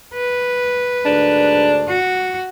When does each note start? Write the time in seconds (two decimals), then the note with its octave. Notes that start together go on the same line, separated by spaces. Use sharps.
0.14 B4
1.05 D2 G#2 D4
1.88 F#4